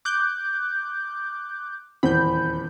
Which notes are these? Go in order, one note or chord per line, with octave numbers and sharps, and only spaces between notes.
D6 F#6 G6
D#1 E2 C4 B5 G6